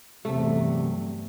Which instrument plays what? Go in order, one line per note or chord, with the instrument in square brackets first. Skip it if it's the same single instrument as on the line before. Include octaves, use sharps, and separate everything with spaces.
[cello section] E2 G2 F#3 [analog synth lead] C3 [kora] A3